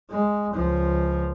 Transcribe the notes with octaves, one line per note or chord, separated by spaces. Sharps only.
G#3
C#2 F3